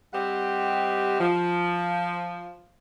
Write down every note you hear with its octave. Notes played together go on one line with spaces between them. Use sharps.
G3 C4 G4 D#5 F#5
F3